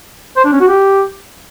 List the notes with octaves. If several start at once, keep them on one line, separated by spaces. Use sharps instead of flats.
C5
D4
C#4
F#4
G4